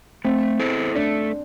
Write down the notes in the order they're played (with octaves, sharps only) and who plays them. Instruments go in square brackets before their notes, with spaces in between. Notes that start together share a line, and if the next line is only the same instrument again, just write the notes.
[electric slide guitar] A3 [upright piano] C4
[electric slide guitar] E4 A4 C5
[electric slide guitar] A3 [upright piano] D4